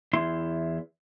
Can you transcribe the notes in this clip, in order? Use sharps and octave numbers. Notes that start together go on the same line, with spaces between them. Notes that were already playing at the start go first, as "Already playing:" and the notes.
E2 E4 C6